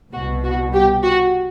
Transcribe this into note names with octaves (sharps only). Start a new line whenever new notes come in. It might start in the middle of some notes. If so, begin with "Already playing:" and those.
C2 B2 F#4
F#4
G4
F#4